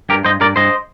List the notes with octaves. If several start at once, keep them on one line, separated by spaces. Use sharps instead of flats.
G2 G4 A#4
G2 C5 D#5
G2 A#4 D5
G2 C5 D#5